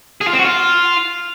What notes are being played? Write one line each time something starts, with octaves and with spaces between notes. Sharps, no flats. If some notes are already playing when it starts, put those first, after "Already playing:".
G#4
F4
C4
F#4
F4